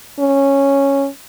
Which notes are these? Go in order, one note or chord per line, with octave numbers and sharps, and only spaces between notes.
C#4